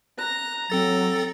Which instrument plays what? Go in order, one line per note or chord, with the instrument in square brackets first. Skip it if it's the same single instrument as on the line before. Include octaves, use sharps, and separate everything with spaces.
[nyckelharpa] A#5 [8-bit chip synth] F#6
[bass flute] F#3 [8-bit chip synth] C4 A4 A6